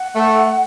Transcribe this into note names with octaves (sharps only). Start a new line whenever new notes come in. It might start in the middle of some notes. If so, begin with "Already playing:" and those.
Already playing: F#5
A3